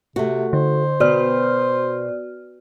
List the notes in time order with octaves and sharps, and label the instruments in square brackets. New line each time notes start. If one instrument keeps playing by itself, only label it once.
[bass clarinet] C3 [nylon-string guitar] A3 F#4
[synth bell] D3 [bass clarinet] C5
[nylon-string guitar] B2 [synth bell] F#4 D5 F6